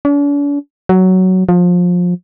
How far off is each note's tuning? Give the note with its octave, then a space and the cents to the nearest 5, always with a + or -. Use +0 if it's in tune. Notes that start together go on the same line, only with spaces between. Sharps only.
D4 -45
F#3 +10
F3 +25